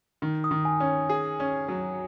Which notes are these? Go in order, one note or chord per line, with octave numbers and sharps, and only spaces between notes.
D#3
D#6
D#3
G#5
C#4
G#4
C#4
F#3